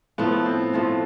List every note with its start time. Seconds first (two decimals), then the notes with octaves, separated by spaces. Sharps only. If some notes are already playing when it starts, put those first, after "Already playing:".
0.18 A2 F3 A3 B3
0.46 C4
0.73 A2 F3 A3